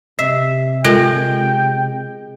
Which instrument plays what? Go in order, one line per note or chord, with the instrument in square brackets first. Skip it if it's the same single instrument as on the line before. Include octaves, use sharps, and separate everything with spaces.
[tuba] C3 [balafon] D#5 [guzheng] E5
[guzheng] G#3 [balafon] F4 A4 A#4 [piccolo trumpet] G5